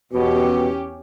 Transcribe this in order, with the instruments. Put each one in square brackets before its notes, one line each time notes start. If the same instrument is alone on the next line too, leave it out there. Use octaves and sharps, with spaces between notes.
[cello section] E2 C#4 G4 [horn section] B2